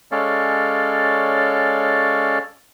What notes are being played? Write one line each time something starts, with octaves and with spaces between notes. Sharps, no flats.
G#3 C#4 A4 C#5 D5 F5